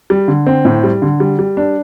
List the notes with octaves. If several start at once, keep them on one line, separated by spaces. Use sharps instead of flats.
G3
D3
C4
A2
G3
D3
G3
G3
D4